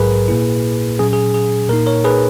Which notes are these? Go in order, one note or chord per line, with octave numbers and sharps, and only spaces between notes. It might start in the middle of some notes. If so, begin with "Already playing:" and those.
Already playing: A#1 G#2 F#3 G#4 A#4 B4
A#2 A#3 E4
A#2 F#3 C#4 G#4
G#4
G#4
A#2 A#3 D#4 A#4
A#4 C#5
G#4 B4